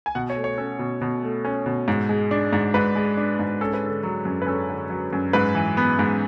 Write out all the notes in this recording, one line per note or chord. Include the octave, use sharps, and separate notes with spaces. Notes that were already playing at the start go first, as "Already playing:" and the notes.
G#5
B2 F#5
C#5
A3
C#5
C#4 A4
B2
B2
A3
C#4
B2
G#2
G#3
D4
G#2
G#2 B4
G#3
D4
G#2
C#4 A4
B4
D3 A4
F#3
F#2
B4
C#4 A4
D3
F#3
F#2
G#2 B4
E3
B3
G#2